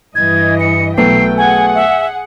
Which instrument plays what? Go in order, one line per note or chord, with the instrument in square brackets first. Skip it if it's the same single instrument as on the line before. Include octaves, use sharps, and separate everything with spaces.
[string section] G2 E3 D#5 [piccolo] G#6
[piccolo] C#7
[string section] B1 G5 [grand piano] F#3 A3 B3 [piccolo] C7
[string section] G#4 F#5 [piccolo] G#5
[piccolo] E5